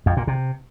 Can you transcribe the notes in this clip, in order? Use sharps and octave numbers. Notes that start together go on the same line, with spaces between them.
F2
A#2
C3